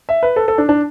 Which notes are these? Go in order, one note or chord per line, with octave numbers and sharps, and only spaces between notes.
E5
B4
A4
A4
D4
D4